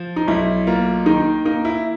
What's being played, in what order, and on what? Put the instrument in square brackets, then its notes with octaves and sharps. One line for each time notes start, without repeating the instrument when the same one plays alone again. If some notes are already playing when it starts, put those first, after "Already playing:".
Already playing: [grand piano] F3
D#4
B1 E4
A#3 F4
D#3 D#4
A#3 D#4
E4